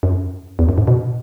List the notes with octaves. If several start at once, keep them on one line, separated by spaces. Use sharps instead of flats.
F#2
E2
F#2
G#2
B2